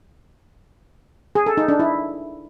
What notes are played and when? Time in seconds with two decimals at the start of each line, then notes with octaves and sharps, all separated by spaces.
1.35 G#4
1.46 A4
1.57 D#4
1.68 D4
1.79 E4